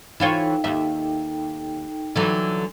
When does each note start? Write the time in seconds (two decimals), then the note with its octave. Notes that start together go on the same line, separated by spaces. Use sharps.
0.20 E3 D#4 F4 A4 C#5 G5
0.64 D#2 E5
2.16 D3 E3 F#3